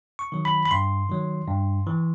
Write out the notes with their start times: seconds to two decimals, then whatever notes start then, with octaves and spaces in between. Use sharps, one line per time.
0.19 C#6
0.32 D#3 F#3
0.45 B5
0.66 B5
0.71 G2 C6
1.09 D#3 F#3
1.48 G2
1.87 E3